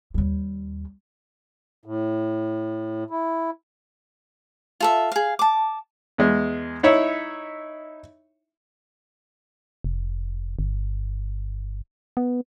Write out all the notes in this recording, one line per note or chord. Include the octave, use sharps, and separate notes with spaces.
D#2 G3
A2
E4
F4 A4 E5
G#4 F5
A5 D6
E2 G#3
D#4 E4 C#5 E5
F1
G1
B3